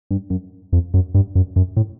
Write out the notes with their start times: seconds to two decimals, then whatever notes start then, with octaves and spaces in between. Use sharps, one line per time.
0.11 G2
0.30 F#2
0.73 F2
0.94 F#2
1.14 G2
1.35 F#2
1.56 F#2
1.77 A2